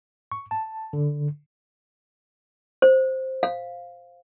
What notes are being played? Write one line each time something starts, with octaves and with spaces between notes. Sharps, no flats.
C#6
A5
D3
C5
F5